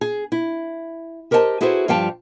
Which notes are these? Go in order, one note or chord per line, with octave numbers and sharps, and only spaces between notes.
G#4
E4
G4 A#4 C5 D#5 G5 A5
E4 F#4 G#4 A4 B4 C5
G2 F3 G3 F5 G5 A5